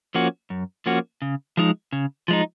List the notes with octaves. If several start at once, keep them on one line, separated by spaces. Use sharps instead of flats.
F3 A#3 C#4 F#4
F#2
F3 A#3 C#4 F#4
C#3
F3 G#3 D#4
C#3
F3 G#3 D#4